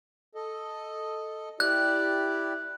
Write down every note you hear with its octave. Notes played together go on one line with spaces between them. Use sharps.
A4 D#5
E4 G4 D5 F#6